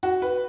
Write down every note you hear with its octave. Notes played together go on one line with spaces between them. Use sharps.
F#4
B4